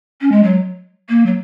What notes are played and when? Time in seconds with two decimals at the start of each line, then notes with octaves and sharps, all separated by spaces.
0.21 C#4
0.32 G#3
0.43 F#3
1.09 A#3
1.26 F#3